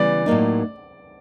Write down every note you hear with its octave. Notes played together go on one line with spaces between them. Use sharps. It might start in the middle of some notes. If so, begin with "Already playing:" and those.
Already playing: C#3 E3 G3 B3 D5
A2 F#3 A#3 D#4